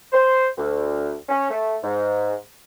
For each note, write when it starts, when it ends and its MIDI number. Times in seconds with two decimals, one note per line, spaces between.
0.13 0.46 72
0.58 1.13 38
1.29 1.49 61
1.50 1.76 57
1.83 2.35 44